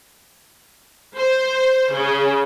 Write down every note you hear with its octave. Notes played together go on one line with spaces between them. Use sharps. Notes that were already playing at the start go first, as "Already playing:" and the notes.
C5
C#3